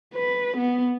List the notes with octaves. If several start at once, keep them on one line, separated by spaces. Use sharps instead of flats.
B4
B3